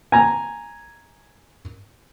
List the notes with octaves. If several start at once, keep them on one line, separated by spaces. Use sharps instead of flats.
G#5 A#5